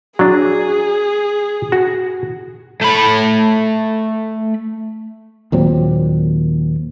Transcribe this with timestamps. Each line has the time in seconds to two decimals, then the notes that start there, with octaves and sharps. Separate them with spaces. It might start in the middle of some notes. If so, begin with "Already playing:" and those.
0.19 F#3 D4 G#4
1.72 F#4
2.81 A3 B5
5.52 D#2 A#2 F#3 C4